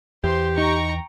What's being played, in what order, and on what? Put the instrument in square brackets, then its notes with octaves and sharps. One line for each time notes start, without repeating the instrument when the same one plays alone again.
[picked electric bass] E2 [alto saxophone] G4 [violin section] C5 C6
[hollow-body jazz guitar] D#4 [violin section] G5 A#5 C#6